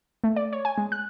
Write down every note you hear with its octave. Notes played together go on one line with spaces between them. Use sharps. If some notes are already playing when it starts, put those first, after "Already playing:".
A3
D5
C#5
G#5
G#3
F#6